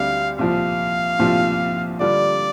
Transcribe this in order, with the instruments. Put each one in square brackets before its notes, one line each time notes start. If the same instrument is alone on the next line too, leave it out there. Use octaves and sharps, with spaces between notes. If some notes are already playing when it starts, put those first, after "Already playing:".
Already playing: [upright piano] D2 D3 G3 C4 G4 [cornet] F5
[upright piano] C2 A#2 F3 C4 F4 [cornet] F5
[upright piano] C2 A#2 F3 C4 F4
[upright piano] D3 G3 D4 F4 [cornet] D5